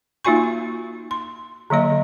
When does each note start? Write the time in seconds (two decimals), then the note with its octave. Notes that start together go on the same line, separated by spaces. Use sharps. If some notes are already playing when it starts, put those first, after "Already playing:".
0.25 A#3 D#4 F4 F#4 G#5 C#6
1.11 C6
1.70 D3 F#3 A#3 D#5